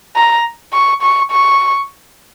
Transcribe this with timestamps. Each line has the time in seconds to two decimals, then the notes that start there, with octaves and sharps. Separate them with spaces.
0.16 A#5
0.73 C#6
1.02 C#6
1.31 C#6